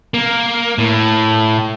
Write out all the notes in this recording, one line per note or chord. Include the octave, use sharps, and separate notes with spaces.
A#3
A2